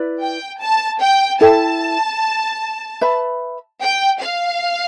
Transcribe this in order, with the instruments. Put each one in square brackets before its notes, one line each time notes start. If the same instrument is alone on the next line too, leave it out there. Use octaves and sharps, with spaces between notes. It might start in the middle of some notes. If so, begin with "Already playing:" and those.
Already playing: [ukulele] E4 B4 D5
[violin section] G5
A5
G5
[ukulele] E4 A4 E5 G5 [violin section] A5
[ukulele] B4 E5 B5
[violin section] G5
F5